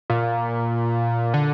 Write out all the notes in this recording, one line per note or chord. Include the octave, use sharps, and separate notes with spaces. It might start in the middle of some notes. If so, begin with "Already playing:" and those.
A#2
D3